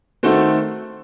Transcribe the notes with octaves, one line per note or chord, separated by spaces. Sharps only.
D#3 A3 C4 F#4 A4